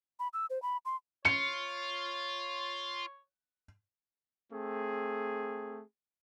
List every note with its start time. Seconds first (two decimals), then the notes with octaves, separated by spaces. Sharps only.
0.19 B5
0.33 E6
0.50 C5
0.62 B5
0.85 C6
1.25 F4 C#5 C#7
4.52 A3 C4 G#4